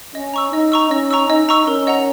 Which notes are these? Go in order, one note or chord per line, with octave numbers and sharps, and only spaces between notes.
C#4 D#5
A#5 C#6 E6
D#4 D#5
A#5 C#6 E6
C#4 D#5
A#5 C#6 E6
D#4 D#5
A#5 C#6 E6
C#4 A#4
D#5 F#5 A#5